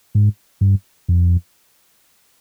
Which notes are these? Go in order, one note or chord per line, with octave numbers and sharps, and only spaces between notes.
G#2
G2
F2